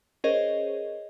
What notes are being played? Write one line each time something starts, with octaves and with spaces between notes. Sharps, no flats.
C#4 G#4 A#4 C5 C#5 D#5